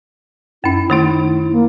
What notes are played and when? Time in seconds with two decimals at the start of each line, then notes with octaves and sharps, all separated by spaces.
0.64 F#2 C#4 E4
0.90 D#3 A3 D#4 E4
1.32 E4
1.52 A#3